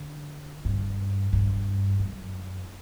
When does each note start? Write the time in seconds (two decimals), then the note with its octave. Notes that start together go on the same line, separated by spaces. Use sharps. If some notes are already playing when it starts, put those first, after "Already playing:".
Already playing: D3
0.65 G2
1.33 G2
1.99 F#2